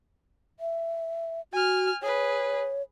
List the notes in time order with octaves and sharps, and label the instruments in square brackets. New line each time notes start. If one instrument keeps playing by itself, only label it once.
[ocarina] E5
[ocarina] F#4 [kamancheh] G#5 F6
[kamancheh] G#4 B4 [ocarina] C#5